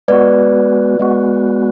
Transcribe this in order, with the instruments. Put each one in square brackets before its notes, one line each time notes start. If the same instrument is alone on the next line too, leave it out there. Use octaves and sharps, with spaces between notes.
[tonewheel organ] G#3 B3 F#4 [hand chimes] B4 D5
[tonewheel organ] G#3 B3 F#4